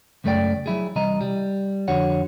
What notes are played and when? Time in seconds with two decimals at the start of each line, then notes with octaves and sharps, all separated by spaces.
0.24 C#2 F#2 A3 C#4 D5 G5
0.66 F#3 E4 G#4
0.96 C2 E3 D#5 A#5
1.21 G3
1.88 F2 D3 F#4 C#5 F#5